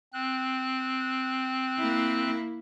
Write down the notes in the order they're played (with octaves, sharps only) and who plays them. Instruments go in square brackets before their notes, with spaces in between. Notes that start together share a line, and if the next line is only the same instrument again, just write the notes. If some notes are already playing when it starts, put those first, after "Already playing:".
[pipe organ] C4 F#6
[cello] A#3 E4